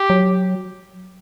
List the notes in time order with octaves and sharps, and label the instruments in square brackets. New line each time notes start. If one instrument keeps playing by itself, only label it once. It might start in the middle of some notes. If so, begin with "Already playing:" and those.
Already playing: [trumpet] G4
[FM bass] F#3